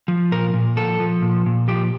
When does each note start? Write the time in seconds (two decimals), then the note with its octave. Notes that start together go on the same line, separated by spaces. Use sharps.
0.08 F3
0.32 A#2 A#4
0.54 A#2
0.76 F3 A4
1.00 F3
1.22 A#2
1.46 A#2
1.68 F3 G4